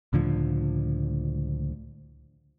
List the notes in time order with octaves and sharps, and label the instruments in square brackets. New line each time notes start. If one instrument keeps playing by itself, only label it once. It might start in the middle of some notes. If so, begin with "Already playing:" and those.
[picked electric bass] C#2 A2 D3 F3